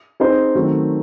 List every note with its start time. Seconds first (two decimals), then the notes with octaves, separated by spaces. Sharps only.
0.20 C4 D#4 G#4 C5
0.55 D#3 F#3 A3 C4